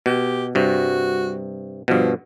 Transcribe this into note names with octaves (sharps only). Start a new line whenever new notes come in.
B2 G4
G2 C3 F#4
G2 B2 F3